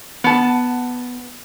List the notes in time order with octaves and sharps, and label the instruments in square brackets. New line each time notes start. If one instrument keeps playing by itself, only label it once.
[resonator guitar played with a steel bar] B3 A5